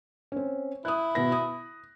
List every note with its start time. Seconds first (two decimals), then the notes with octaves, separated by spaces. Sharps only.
0.32 C4 C#4
0.85 E4 D#6 F#6
1.15 B2 B3 A#6
1.32 D#6